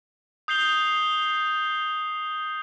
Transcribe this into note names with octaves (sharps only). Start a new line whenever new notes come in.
D#6 G6 C7 F7 G7